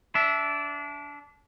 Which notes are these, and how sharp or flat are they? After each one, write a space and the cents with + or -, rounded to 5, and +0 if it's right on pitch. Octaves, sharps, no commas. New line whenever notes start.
D4 -25 E5 +0